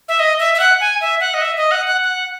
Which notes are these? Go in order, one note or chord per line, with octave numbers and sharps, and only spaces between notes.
E5
D#5
E5
E5
F#5
G#5
E5
F#5
D#5
E5
D#5
F#5
F#5
F#5